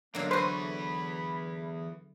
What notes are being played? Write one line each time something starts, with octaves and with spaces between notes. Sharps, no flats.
D3 F#3 G#3 A#3 B3 D4 F5
E2 A3 F#4 B4 C5 G#5 B5